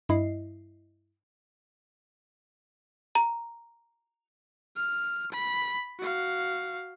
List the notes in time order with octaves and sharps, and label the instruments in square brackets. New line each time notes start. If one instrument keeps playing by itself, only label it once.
[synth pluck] G2 E4 D#5 C7
[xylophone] A#5
[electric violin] F6
B5
F#4 F5